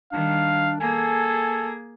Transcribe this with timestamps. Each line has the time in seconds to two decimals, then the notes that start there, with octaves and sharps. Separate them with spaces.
0.13 D#3 G3 D4 F5
0.80 A#3 G#4 A4 G#5